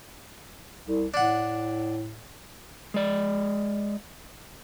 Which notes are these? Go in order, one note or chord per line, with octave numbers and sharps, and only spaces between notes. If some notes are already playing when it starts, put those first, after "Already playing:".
C2
A2 D4 F#5
G#3 D5